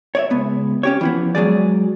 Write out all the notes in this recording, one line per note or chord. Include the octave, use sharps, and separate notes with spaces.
C#5 D5 E5
C#2 B3
C#4 G4 C#5
E3 F3 B3
F#3 G#3 G#4 D5